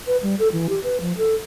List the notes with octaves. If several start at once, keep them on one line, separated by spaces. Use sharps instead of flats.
B4
G3
A4
E3
G4
B4
F3
A4